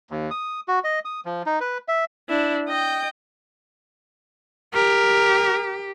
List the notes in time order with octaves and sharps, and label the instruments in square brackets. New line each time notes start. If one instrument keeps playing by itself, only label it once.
[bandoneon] D#2
D#6
F#4
D#5
D#6
F3
D#4
B4
E5
[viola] D4 E4
D#5 G5
[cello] G4 [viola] A#4